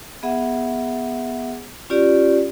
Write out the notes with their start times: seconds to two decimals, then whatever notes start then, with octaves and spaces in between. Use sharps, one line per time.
0.23 B3 G#4 E5 F#5
1.90 C#4 F4 G4 D5